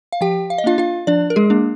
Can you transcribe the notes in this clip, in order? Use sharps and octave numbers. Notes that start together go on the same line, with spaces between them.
F5
F3 G4 G5
F5
D#5
A#3 D4 F4 F5
F4 F5
F3 D4 D5
A#4
G#3 G#4
A#3 D4